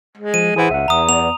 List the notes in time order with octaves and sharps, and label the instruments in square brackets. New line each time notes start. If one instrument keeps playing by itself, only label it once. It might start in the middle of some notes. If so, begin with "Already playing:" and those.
[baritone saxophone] G#3
[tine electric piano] F3 [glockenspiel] D#7
[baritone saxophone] E3 [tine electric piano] G#4 C5 F#5
[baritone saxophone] C#2 [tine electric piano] E5 F#5
[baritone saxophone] E2 [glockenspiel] A#5 D#6
[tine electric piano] B3 D5 [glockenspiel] F7